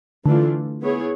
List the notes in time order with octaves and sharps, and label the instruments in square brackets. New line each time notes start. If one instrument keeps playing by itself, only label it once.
[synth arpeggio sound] D3 [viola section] E3 A3 D4 F4
[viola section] B3 E4 G#4 C#5